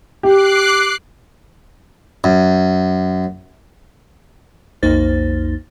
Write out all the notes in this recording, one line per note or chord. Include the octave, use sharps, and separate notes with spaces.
G4 D6 F#6 C7
F#2
B1 F2 A#3 D#4 C5 A6